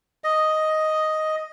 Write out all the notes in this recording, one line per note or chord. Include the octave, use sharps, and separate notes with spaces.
D#5